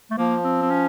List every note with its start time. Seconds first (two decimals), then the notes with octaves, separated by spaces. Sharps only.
0.11 A3
0.18 F3 A#3
0.44 C4
0.62 C4
0.71 C#4